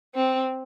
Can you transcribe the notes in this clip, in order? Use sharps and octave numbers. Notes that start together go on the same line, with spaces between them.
C4